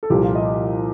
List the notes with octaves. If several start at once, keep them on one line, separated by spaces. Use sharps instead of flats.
A4
C2 A#2 F3 G4
F4
D#5